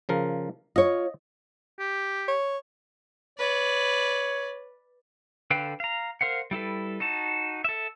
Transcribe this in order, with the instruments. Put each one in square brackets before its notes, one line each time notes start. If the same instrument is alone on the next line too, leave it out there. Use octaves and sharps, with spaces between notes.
[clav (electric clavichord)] C#3 F3 A#4
[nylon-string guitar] F4 C#5 [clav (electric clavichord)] D#5
[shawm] G4
[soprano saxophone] C#5
[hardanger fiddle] B4 D5 [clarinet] C#5
[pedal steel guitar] D3 A4 B4 F5 G5
F5 A#5
A#4 C5 F5 F#5
G3 E4 A4 B4
D#4 F#4 A5
A4 E5